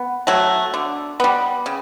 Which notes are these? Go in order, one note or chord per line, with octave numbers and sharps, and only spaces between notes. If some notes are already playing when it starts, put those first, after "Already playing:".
Already playing: B3
F#3 A3
D3
G3 B3
C#3